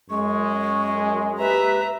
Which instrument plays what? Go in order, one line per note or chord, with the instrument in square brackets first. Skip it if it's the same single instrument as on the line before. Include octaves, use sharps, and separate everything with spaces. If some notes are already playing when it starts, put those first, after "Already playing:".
[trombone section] F#2 G#3 [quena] C#6
[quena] G4 [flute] B4 [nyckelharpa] E5 A#5